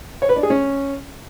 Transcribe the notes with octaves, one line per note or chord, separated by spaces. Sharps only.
C#5
B4
D4
G#4
C#4